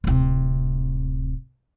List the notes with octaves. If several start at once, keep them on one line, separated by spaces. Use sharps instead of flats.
D1 C3